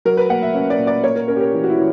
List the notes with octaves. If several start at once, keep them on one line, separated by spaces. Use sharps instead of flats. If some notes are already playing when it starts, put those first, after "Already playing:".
F#3 A#4
B4
A#3 F#5
E5
C#4 E5
D5
A#2
D5
A#3 C#5
A#4
C#4 A#4
G4
A#4
E3
F#4
E4
E3